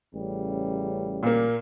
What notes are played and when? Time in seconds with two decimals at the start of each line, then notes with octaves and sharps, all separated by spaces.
0.13 A1 C#3 G3
1.23 A#2 A#3